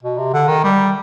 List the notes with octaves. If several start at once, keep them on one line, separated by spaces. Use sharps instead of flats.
B2
C3
D3
D#3
G3